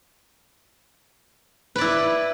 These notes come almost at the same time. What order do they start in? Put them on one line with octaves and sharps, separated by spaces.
B4 D5 E4